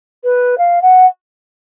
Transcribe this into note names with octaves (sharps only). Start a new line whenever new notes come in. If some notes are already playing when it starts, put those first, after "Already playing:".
B4
F5
F#5